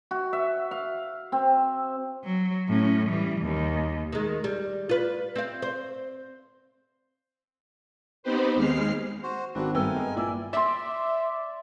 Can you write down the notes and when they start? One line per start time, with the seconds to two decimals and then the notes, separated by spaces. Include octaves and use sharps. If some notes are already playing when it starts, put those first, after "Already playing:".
0.11 F#4
0.33 E5
0.71 F5
1.32 C4
2.24 F#3
2.69 A2 C#4
3.10 E3 G3
3.42 D#2
4.13 D#3 G#3
4.44 G3
4.89 F4 B4
5.36 C4 F5
5.62 C5
8.23 B3 C4 D#4 G4 B4 C5
8.56 D#2 G#3 F6 C7
9.23 F#4 C5
9.55 G#1 A#3 C4 D4 F#4 B4
9.75 G2 A3 B3 A#4 G5 G#5 E6
9.96 G#3
10.16 A#2 E4 D5 G#5 E6
10.53 D5 E5 C6